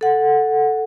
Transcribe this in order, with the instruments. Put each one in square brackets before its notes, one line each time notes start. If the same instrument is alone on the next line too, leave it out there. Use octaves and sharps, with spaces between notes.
[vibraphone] A4 F#5